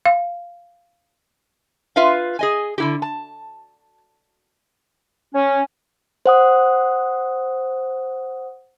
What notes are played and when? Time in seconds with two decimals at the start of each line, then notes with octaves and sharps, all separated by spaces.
0.05 F5
1.96 F4 B4 E5 F5
2.39 G#4 D#5 G#5
2.78 D3 E4 G4
3.02 A5
5.34 C#4
6.26 C5 F#5 D#6